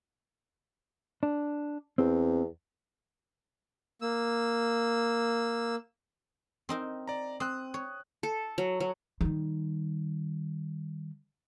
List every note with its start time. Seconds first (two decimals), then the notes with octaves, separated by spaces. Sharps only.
1.23 D4
1.98 E2 C4
4.02 A#3 E6
6.69 C4 D#4 A#4
7.08 D5 A#5
7.40 C4 D#6 F#6
7.74 C#5
8.23 A4
8.58 F#3
8.80 F#3
9.21 D#3 G3